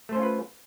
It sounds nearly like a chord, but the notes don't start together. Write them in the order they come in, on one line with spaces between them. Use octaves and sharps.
A3 C5 C#4 F4 B4